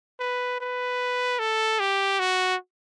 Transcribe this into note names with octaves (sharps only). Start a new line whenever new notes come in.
B4
B4
A4
G4
F#4